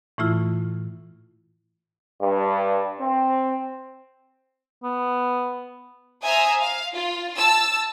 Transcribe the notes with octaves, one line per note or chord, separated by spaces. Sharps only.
A2 E3 A3 E4 F4
G2
C4
B3
C5 E5 G#5 A#5 D#6
F5
F4
A5 E6